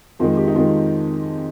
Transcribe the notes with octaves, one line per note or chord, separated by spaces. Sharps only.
F2 D#3 G#3 F4
G4
D#4
F2 D#3 G#3 F4